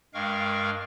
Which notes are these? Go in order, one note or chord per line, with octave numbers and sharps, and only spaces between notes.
G2 G#3 A#4 F5 G5 C#6